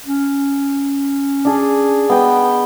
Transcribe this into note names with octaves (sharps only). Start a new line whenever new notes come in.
C#4
D4 G#4
B3 D#5 G5